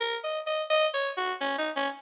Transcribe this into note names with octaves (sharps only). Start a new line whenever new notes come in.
A#4
D#5
D#5
D#5
C#5
F#4
C#4
D#4
C#4